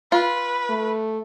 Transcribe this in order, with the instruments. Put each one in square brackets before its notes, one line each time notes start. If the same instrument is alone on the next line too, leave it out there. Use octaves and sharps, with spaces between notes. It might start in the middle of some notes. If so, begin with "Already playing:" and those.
[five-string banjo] F4 [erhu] B4
[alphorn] A3